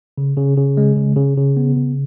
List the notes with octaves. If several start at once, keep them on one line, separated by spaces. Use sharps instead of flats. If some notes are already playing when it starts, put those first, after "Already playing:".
C#3
C#3
C#3
G#3
C#3
C#3
C#3
B3
C#3